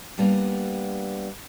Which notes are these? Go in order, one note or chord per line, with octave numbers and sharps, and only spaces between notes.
G3 A#3 B3 D4